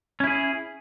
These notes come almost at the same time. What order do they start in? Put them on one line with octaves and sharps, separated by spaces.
C#4 E4 G#4